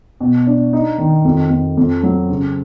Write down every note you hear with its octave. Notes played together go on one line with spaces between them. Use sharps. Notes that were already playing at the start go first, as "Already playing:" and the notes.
B2
D4
D#4
D#3
F2
F2
F2
F#3
C#3